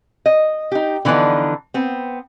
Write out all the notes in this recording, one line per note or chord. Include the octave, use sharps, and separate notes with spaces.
D#5
D#4 G4
D3 E3 F3 B3 D4 D#4
B3 C4